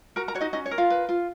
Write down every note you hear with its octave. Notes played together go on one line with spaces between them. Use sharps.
F#4 A#4 A#5
A#4 A#5
F#4 C#5
D#4 D#5
C#4 D#4 D#5
C#5
A#4
F4 F5
B4
F4